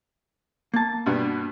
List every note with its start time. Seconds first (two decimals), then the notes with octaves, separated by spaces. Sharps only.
0.74 A#3 A5
1.06 G2 B2 B3